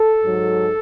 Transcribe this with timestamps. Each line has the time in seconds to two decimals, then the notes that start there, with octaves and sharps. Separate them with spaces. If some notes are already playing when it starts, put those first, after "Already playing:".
Already playing: A4
0.24 G#2 F#3